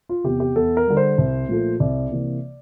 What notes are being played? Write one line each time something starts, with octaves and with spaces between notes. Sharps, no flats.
F4
E2 C3 G4
G4
E2 A4
A#4
D3 G3
C5
C2
A#2 F3 A3
C2 D5
C3 E3 A#3